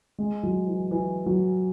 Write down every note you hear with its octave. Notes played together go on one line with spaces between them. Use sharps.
G#3
F#3
E3
E3
F#3